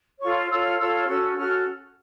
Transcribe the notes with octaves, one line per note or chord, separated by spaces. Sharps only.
F4 A4 C#5 C#6
F4 A4 C#5 E6
F6
F4 A4 C#5 E6
F6
C#4 F#4 A4 E6
C#4 F#4 A4 F6